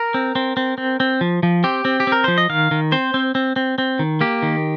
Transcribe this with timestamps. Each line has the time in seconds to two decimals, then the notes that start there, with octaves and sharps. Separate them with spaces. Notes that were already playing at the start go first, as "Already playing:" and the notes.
Already playing: A#4
0.14 C4
0.35 C4
0.57 C4
0.78 C4
1.00 C4
1.21 F3
1.43 F3
1.64 C4 G4
1.85 C4
2.00 G4
2.07 C4 A#4
2.24 F3 C5
2.38 D#5
2.49 D#3 F5
2.71 D#3
2.92 C4 C5
3.14 C4
3.35 C4
3.56 C4
3.78 C4
3.99 D#3
4.21 A#3 G4
4.43 D#3